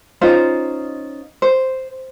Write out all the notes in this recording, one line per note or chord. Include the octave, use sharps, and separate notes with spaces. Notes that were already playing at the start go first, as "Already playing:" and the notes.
C#4 D#4 F4 C5
C5